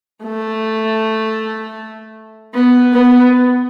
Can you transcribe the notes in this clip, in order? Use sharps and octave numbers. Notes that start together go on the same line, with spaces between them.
A3
B3
B3